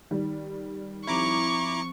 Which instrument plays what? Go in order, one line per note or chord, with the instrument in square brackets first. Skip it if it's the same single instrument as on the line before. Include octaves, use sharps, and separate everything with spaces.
[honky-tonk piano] D#3 G3
[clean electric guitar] F3 C4 F4 [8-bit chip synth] E4 A#5 D6 [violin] C#6